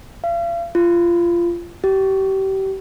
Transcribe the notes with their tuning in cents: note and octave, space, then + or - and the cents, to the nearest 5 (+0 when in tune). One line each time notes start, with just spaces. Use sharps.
F5 -40
F4 -20
G4 -30